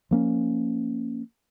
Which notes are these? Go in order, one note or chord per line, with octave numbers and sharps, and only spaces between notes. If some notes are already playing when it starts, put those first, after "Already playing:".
F3 A#3 C#4